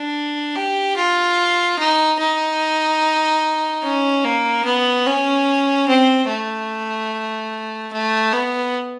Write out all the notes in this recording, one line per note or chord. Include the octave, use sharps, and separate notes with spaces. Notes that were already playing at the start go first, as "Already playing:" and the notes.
Already playing: D4
G4
F4
D#4
D#4
C#4
A#3
B3
C#4
C4
A3
A3
B3